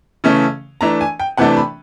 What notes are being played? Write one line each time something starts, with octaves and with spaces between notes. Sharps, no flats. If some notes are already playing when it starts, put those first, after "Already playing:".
C#3 E3 A3 C#4
E3 A3 D4 A#5
G#5
G5
C3 E3 A3 D4 F#5
B5